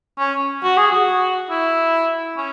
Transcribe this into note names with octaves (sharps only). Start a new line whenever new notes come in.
C#4
F#4
G#4
F#4
E4
C#4